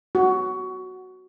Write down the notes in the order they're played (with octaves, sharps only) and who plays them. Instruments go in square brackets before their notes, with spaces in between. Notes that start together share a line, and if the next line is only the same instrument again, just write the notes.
[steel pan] F#4